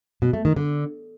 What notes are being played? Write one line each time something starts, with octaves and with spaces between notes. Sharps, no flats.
B2
A3
D#3
D3